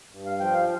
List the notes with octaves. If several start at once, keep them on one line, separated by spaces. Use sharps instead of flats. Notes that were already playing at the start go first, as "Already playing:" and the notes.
G2
F5
F3 G5
F5